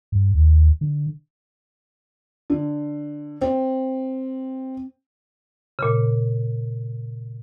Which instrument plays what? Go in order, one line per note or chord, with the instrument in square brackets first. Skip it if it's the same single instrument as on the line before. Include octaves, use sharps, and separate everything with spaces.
[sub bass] G2
D#2
D3
[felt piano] D3
C4
[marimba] A#2 C#3